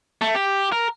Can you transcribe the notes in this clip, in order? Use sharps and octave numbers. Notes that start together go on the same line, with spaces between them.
A3
G4
A#4